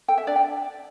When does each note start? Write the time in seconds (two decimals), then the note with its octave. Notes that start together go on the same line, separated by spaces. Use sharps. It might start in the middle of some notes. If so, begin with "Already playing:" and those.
0.08 A4 G5
0.18 E5
0.27 D4 D5
0.36 G5